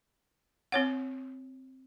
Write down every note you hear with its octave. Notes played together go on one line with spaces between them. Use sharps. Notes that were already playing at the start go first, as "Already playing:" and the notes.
C4 C#5 F#5